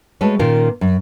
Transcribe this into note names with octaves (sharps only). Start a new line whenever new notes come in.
G#3 A3 F#4 A4 B4 C#5
A#2 D#3 A#3 C#4 F4 A#4
F#2